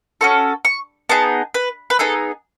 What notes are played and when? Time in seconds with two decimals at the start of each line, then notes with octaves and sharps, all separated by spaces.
0.21 C#4 F#4 A4 C#6
0.65 C#6
1.09 B3 D#4 G#4 A5
1.54 B4
1.90 B4
1.99 B3 D#4 G#4 A4